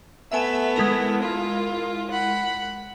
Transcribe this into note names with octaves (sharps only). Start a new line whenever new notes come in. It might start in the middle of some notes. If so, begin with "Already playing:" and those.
A3 B3 E5 G#5 E7
G#3 E4 A#4
F4
F#5 B5